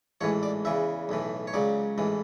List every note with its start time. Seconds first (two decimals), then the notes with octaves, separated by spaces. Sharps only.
0.21 A1 G#2 E3 C#5
0.43 D5
0.65 E2 C#3 E3 E5
1.09 B1 A2 E3
1.47 C#5
1.53 C#2 C#3 F#3 D5
1.98 A1 G#2 E3